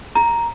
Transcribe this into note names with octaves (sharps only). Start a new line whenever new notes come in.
A#5